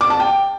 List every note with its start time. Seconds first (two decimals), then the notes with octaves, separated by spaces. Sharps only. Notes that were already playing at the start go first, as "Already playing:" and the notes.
0.01 D6
0.10 A5
0.20 G5